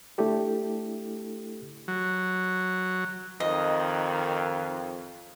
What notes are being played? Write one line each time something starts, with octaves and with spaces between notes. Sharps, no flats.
A3 D4 E4 G4 A4
F#3
F2 D#3 D#5